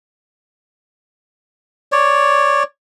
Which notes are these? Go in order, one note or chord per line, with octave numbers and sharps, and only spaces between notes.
C#5 D5